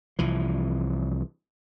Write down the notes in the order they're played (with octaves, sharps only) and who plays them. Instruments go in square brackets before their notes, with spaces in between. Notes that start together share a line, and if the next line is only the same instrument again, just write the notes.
[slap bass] C2 E3 F3